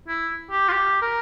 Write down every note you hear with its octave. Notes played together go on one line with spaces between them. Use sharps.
E4
G4
F4
G4
A#4